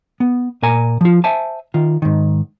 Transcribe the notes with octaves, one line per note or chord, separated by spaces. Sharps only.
B3
A#2 A#4 G#5 A#5
F3 F4
C5 E5 G#5 A5
D#3 F4
G#2 D#3